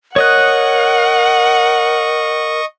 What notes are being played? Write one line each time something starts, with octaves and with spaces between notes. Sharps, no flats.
A#4 C#5 D#5 F#5 C#6 D#6 F#6